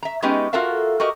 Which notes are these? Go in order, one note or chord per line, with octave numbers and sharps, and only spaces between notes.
E5 A#5
G#3 B3 C#4 D#4 G4
F4 F#4 A4 A#4 E5 F5
F#4 G4 A#4 D#5